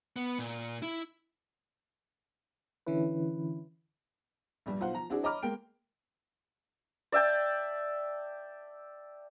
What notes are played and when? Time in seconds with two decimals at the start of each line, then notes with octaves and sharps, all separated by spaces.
0.16 B3
0.39 A#2
0.82 E4
2.86 D3 E3 C#4 E4 B4
4.66 A#1 G2 G3
4.80 B1 F4 C5 F#5
4.94 F3 A#5
5.10 C4 D4 E4 F#4 G#4
5.23 C#5 D#5 A#5 B5 D6 F6
5.42 G#3 A#3 A#4 G5 D7
7.12 D5 E5 G5 A5